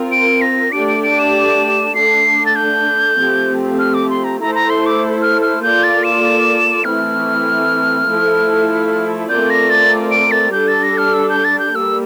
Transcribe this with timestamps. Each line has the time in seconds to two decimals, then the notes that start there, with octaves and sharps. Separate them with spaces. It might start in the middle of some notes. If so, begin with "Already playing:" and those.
Already playing: C4 F4 A#4
0.11 D7
0.41 A#6
0.72 A3 D4 G4 D5 D7
0.88 D7
1.03 D7
1.19 E7
1.95 D3 A3 D4 C7
2.46 A6
2.56 G6
3.17 F3 A3 C4 G4
3.79 F6
3.94 D6
4.10 C6
4.24 A#5
4.40 A3 E4 A4 C5 A#5
4.55 A#5
4.70 C6
4.86 D6
5.22 F6
5.42 F6
5.62 A#3 F4 A4 D5 G6
5.83 A6
6.04 E7
6.84 E3 A3 C4 E4 F6
8.07 F3 A3 E4 A4
9.29 A3 C4 F4 A#4 D5 G6
9.50 A#6
9.70 A6
10.11 D7
10.31 A6
10.52 G3 D4 A4 G6
10.68 A6
10.83 A#6
10.98 F6
11.13 E6
11.29 G6
11.44 A6
11.59 G6
11.74 G3 A#3 E6